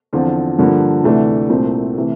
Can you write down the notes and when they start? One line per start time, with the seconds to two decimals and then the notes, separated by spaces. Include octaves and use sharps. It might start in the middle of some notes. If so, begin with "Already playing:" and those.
0.13 E2 D3 F3 C4 F4
0.58 G2 D3 F3 A#3
1.04 D2 C3 E3 A3 D4
1.49 C2 A#2 A3 C4
1.97 C3 E3 A3